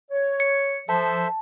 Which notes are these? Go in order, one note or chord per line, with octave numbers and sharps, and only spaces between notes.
C#5
C#7
F3 A4 C5 E5 A5